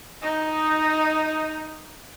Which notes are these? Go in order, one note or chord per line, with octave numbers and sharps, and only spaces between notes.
D#4 D#5